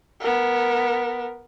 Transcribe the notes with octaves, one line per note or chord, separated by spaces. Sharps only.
B3 A#4